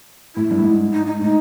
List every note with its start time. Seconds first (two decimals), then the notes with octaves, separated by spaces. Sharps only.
0.36 A2 E4
0.51 G2
0.59 A2
0.64 G#2
0.93 D#4
1.07 D#4
1.21 A2 D#4